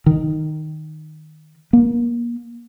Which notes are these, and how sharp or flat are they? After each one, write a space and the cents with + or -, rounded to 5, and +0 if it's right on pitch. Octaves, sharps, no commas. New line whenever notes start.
D#3 -5
A#3 +30